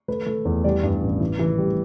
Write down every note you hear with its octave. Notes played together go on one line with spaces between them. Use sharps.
A3 B4
A3
E2
G3 D5
G2
A1
E3
E3
G3